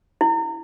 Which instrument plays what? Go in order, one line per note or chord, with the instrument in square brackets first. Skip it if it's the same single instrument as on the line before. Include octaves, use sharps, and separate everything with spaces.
[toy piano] E4